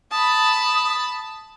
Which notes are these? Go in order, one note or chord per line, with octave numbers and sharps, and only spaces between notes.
A5 B5 D#6